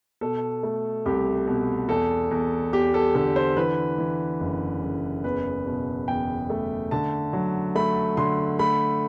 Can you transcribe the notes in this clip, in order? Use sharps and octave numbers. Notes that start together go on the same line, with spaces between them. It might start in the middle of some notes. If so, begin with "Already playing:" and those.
B2 A4
A3
C2 G4
B2
E2 A4
E2
E2 G4
A4
D3 A4
C5
E3 B4
E3
F#1
F#1
E2 B4
B2
E2 G5
A3
D3 A5
F#3
A3 B5
D3 C6
A3 B5